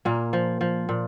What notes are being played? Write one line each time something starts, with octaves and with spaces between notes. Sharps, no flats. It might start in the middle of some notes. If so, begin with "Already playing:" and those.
A#2 A#3
F3
F3
A#2